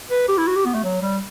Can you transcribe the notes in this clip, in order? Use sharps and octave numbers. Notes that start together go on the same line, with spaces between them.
B4
G4
E4
F#4
G4
B3
A3
F#3
G3